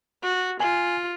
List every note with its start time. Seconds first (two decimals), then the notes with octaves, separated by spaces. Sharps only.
0.23 F#4
0.60 F4 G#5